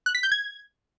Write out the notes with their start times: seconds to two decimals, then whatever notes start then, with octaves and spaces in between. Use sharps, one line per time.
0.06 F#6
0.15 B6
0.23 G6
0.32 G#6